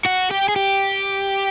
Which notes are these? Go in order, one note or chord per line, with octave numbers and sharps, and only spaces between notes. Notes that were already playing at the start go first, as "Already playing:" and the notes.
F#4
G4
G#4
G4